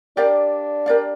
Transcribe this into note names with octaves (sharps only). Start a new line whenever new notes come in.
D4 G4 A#4 D5 F5
G4 A#4 D5 F5